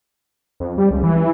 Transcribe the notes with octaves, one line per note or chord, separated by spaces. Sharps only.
F2
G3
C#2
E3